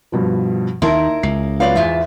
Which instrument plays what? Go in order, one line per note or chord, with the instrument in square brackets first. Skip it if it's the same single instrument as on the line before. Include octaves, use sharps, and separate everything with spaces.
[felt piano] G2 B2 F3
[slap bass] D#2 D#3 [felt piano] D#4 A5 C6 [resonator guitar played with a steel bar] E4 A#4
[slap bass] C#2 [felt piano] C7
[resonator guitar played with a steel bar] F#3 D5 F5 [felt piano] B3 F4 C#5
[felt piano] E2 [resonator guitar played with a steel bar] G#2 F4 E5